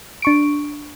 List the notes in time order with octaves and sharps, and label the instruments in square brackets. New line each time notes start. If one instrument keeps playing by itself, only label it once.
[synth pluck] D4 C#6 D7